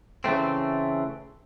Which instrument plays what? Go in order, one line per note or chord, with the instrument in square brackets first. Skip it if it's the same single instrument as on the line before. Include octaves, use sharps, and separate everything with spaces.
[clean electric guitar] C#3 E3 A3 C4